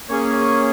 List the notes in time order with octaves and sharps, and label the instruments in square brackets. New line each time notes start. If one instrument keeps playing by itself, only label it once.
[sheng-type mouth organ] A#3 C#4 G#4 C#5